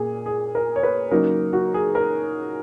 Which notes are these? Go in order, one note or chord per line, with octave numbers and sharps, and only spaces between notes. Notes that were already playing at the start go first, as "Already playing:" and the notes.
Already playing: A#2 A#3 G#4
G#4
A#4
C#5
B4
C#3 F#3 A#3 D#4 A#4
F#4
G#4
A#4